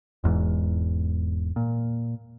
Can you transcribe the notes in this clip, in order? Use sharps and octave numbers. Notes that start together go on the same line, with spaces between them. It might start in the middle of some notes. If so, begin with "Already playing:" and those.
E1 E2 G#2
A#2